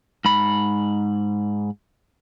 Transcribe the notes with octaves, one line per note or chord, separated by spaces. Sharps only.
G#2 B5